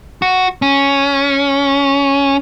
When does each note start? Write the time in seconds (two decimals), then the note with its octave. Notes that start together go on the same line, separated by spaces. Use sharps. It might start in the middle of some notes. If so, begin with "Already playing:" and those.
0.22 F#4
0.62 C#4